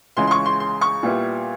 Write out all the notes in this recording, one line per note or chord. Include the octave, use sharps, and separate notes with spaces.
C#2 C#3 E3 G#3 C#4 C6
C6
C#6
C6
C6
C#6
A#2 G3 B3 E4